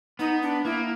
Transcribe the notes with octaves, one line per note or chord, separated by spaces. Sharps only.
B3 D#4
D4
A#3 E4